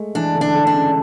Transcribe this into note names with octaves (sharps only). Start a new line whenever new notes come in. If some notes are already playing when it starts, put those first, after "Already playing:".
Already playing: G#3 A3
E3 D4
D3
D4
D3
D4
C#3